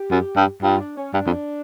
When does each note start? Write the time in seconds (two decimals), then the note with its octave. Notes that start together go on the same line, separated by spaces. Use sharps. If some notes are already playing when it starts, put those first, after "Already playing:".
Already playing: G4
0.11 F#2
0.37 G2
0.62 G2 F4
0.79 D4
0.97 C#4
1.14 G2 D4
1.27 F2